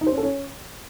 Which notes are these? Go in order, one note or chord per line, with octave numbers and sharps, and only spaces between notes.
D#4
C5
C#4
A4
C#4